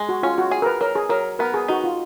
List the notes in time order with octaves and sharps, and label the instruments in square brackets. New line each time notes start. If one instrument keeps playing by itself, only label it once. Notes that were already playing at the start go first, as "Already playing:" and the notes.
Already playing: [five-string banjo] G#3
[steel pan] F#4
[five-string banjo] C#4 [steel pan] F4
[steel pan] F#4
[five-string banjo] G#4
[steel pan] A#4
B4
[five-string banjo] F#3 [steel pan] A#4
[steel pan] G#4
[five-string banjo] F#3 [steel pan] A#4
[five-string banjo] B3 [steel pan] A#4
[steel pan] G#4
[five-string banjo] D#4 [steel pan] F#4
[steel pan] F4